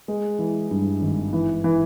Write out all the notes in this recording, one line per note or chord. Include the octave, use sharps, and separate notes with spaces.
G#3
E3
G2
G#1
E3
E3